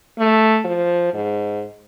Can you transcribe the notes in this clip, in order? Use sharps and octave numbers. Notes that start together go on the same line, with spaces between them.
A3
F3
G#2